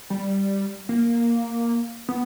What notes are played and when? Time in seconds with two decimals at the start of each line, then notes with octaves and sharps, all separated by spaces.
0.10 G3
0.89 A#3
2.09 B3